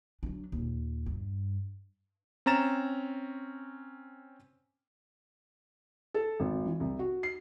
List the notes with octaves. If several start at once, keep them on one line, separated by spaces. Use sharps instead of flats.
F#3 D4
D#2 A#2
G2
C4 C#4 A#5 A6 E7
A4
G#1
E3
C2
F#4
C7